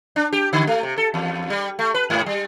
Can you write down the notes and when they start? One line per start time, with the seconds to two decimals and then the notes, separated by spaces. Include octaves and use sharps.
0.16 D4
0.33 G4
0.53 D3
0.67 A3
0.83 C3
0.98 A4
1.14 E2
1.50 G3
1.79 A3
1.94 B4
2.10 G#2
2.26 G3